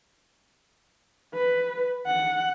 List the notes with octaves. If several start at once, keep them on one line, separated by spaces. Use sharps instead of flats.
B4
F#5